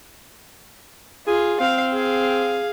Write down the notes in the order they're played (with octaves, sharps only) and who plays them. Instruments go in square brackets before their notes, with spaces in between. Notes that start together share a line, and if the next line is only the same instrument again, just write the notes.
[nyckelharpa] F4 [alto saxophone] G#4
[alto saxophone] C4 [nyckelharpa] F5
[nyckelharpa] G#4 F5